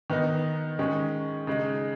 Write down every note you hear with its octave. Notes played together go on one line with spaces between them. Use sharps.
D#3 B3 D#4
D#3 G#3 C#4
C#3 G#3 D#4